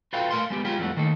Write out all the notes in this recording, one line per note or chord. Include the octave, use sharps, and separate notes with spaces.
F4 F#4 A4 B4 F5 G5
A3 A#4 F5 C6
G#3 B3 G4
G#3 F4 G4
F2 E3 G3 A3 F#5
D#3 A3 A#3 A4